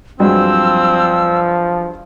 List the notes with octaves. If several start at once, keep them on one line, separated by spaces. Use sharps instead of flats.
G2 F3 F#3 G#3 C4 E6